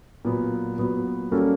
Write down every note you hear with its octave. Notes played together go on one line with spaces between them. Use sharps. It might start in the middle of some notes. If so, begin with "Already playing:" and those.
A#2 F#3 B3
A#2 F#3 B3
G3 A#3 C#4 F#4 A4